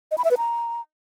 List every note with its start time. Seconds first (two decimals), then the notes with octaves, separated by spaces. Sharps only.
0.11 D#5
0.18 B5
0.24 E5
0.31 B4
0.37 A#5